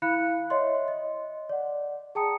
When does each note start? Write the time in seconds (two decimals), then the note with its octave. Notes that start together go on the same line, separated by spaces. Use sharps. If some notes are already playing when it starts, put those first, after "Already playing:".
0.02 E4 F5 B5 F#6 C#7
0.50 C#5 D#5 E5 C6
0.88 D#5
1.49 D5 F#5
2.15 G#4 G5 A5 A#5 D#6 C#7